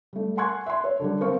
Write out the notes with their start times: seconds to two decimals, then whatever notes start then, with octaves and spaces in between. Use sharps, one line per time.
0.13 G3 A3
0.37 F#5 G#5 C6 C#6 F#6 G#6
0.66 E5 C6
0.84 C#5
1.00 D3 F#3 G3
1.21 B3 C4 A#4 B4 F5 C#6